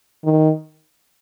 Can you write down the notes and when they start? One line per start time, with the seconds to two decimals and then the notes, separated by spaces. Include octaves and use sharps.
0.24 D#3